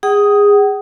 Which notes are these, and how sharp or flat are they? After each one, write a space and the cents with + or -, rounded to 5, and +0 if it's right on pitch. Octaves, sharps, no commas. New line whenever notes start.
G#4 -25 F#5 +45 D#6 +5